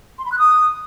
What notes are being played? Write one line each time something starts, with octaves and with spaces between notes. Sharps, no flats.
C6
B5
F#6
D#6